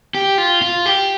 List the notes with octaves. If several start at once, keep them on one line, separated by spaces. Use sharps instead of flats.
G4
F4
F4
G4